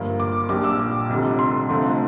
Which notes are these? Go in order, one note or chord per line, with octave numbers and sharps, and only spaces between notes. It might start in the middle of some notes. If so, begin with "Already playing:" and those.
Already playing: G1 G2 F3 A#3
D6
A#1 A#2 G3 D4 D6
E6
D6
F1 F2 D3 G3
C6
F1 F2 D3 F3 A3